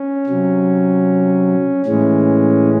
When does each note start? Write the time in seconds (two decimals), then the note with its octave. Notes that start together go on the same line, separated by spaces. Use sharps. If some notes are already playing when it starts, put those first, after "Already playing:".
Already playing: C#4
0.26 C3 F#3
1.86 A2 E3 G#3 C#4